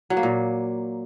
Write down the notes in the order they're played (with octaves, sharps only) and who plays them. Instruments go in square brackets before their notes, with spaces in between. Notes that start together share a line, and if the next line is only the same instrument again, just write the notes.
[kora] F#3
A#3
A#2